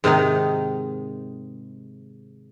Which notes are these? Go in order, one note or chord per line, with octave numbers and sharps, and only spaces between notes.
G#2 C3 D#3 D#4